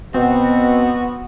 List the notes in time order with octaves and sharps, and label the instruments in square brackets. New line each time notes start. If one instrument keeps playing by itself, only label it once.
[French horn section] B2 [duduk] B3 [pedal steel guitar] C4 [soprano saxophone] F#4